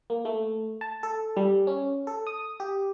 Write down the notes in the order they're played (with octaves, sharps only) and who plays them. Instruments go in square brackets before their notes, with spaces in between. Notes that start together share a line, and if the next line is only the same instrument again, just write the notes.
[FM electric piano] A#3
A3
A5
A4
G3
C#4
A4
D#6
G4